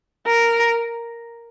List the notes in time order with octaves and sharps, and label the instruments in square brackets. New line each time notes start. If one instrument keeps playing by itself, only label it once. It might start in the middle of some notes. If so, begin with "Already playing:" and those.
[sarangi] A#4